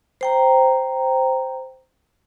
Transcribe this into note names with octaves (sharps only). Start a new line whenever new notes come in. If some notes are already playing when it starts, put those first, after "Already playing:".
C5 G5 A#5